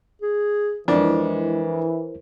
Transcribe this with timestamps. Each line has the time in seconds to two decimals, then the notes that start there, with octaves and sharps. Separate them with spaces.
0.22 G#4
0.88 F2 E3 G#3 D4 E4 A#4 C5